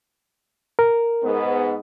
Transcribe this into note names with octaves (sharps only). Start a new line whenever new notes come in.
A#4
G#2 B3